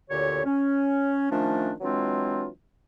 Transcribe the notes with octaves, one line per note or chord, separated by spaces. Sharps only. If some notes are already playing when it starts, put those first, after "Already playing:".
D2 A#2 D3 G4 C#5
C#4
D#3 F3 A3 C#4 D4
E3 F#3 G#3 C4 D4 F4